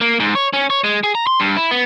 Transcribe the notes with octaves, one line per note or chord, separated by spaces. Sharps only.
A#3
G#2
C#5
C#4
C#5
G#3
G#4
A#5
C6
G2
E4
B3